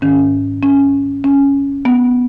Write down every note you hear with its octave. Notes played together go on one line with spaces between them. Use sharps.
G#2 D#3 C#4
C#4
C#4
B3